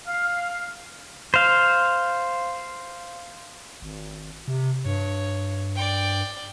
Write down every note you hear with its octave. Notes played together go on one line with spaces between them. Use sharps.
F5
C5 F5
G#1
C3
G2 C#5
D5 G5